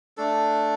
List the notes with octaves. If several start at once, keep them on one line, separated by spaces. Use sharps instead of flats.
A3 D4 A4